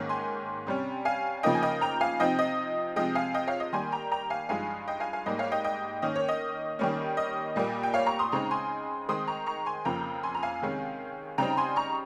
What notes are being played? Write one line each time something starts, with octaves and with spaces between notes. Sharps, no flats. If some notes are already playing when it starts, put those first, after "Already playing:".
Already playing: G#2 D#3 A#3 C#4
G#5 C6
C3 G3 C#4
F5 G#5
C#3 F3 A#3 D#4 D#5 G5
G#5
D#5 G5
G5 A#5
F5 G#5
C3 F3 C4 D#4 D#5 G5
D#5
C3 F3 G#3 D#5 G5
F5 G#5
D#5 G5
C#5 F5
D#5
D#3 G3 A#3 G#5 C6
G5 A#5
G5 A#5
F5 G#5
G2 F3 G#3 D#4 F5 G#5
D#5 G5
F5 G#5
F5 G#5
G#2 G3 A#3 D#5
C#5 F5
D#5 G5
D#5 G5
D#3 A#3 C#4 D#5
C#5
D#5
D#3 G3 A#3 C#4
D#5
A#2 G3 A#3
G5
C#5 F5
A#5 C#6
C6 D#6
C#3 G#3 C4 D#4 A#5 C#6
G#5 C6
D#3 G#3 C4 D#4 C6 D#6
A#5 C#6
A#5 C#6
G#5 C6
F2 C#3 F3 A#3 G5 A#5
G#5 C6
A#5
F5 G#5
C3 D#3 G#3 C#4
C#3 G3 C4 D#4 G5 A#5
G#5 C6
A#5 C#6